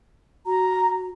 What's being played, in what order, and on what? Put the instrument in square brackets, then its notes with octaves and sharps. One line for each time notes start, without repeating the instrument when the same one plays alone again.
[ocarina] F#4 [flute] A#5